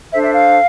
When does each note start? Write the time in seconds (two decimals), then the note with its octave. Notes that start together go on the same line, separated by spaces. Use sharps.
0.12 D4 A4 C5 E5
0.23 E5
0.34 F5